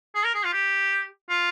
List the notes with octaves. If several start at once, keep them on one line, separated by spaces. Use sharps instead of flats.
G#4
A#4
G#4
F4
G4
F4